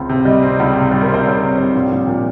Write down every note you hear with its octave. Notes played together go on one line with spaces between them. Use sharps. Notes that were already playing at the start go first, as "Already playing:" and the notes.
Already playing: C#2 C4
C3
G3 D#5
C4
C#2
C3
G3
A#4
C4
C5
C#2 C#5
C3
G3
A#1
A#1
A#2